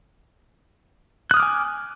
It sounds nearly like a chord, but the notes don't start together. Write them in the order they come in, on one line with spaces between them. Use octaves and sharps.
F#6 D#6 F6 D6 G#5